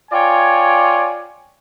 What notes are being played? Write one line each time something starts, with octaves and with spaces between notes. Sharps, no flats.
F4 C#5 D5 G5 G#5